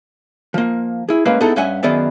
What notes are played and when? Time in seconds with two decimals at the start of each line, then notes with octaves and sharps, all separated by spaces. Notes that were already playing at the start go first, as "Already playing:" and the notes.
0.54 F3 A#3
1.09 E4 G#4
1.25 G#3 A#3 C#4 B4 F5
1.41 B3 D#4 E4 G#4 A4 F#5
1.56 G2 C#4 E5 F#5 G#5
1.83 F#2 D#3 B3 G#4 D5 E5